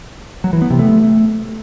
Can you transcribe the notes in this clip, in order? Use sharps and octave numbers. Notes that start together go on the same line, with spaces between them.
F#3
E3
B3
C3
A3